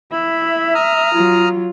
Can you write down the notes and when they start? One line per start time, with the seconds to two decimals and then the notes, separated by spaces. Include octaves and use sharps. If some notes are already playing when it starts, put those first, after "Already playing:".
0.12 E4 E5 B5
0.75 A#5 D#6 F6
1.14 F#3 F4